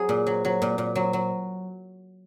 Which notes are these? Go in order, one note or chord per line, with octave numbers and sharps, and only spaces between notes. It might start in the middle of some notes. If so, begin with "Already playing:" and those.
Already playing: F#3 F#4 G#4
A#2
F#3
F#3
A#2
A#2
F#3
F#3